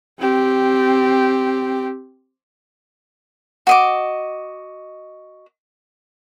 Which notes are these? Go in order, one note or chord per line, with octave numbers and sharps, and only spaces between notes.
C4 G4
F#4 D#5 D6